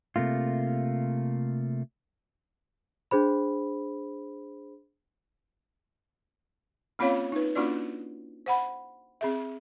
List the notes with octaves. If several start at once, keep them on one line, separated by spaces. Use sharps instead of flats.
C3 A3 A#3 F4
D4 G#4 C5 B5
A#3 C4 C#4 F4 C#5 F5
D#4 B4
A#3 C#4 D4 F4 F#4 D5
C5 F#5 B5
C4 G#4 E5